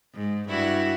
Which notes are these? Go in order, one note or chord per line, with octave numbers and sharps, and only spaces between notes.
G#2
G2 E4 F#4